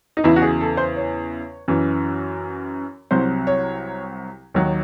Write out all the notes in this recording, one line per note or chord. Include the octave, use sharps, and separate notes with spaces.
D#4
E2 C#3 E3 E4
F#4
G#4
A4
C5
C#5
F#2 E3
C2 C3 F#3 C5
C#5
D#2 D#3 F#3